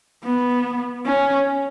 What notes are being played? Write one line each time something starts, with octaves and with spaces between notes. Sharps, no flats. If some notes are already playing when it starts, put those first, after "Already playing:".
B3
C#4